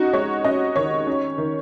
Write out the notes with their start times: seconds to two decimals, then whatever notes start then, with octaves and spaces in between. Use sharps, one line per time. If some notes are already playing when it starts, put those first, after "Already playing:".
Already playing: C#4 D#4 F#4
0.13 G#3 C#5
0.44 C#4 D#5
0.76 D#3 C#5
1.07 C#4
1.38 D#3